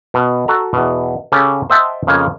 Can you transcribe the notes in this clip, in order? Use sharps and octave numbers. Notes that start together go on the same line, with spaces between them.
B2
F#4 A4 A#5
E2 B2
C#3 C#4 G4 A4
C5 D#5 E5 F#5 G5 A5
F2 C#3 G#3 A#3 G#5